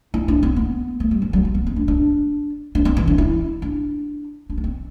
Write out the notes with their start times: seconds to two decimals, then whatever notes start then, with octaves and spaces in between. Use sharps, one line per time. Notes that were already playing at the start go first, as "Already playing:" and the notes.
0.14 E4
0.28 D4
0.43 C4
0.56 B3
1.00 A3
1.11 G3
1.22 E3
1.33 F#3
1.45 G3
1.55 B3
1.67 C4
1.76 D4
1.88 D4
2.75 D4
2.85 C4
2.97 E3
3.08 D4
3.18 E4
3.62 D4
4.50 D4
4.58 B3
4.64 C4